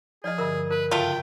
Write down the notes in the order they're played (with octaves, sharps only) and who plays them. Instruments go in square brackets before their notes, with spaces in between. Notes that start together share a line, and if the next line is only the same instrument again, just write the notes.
[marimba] F3 F6 [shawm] G#4 [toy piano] D5 D#5
[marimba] G2 D3 [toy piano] A#4 E5 E6
[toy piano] A#4 [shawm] B4
[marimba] F#2 C#3 [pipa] A3 F4 [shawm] G5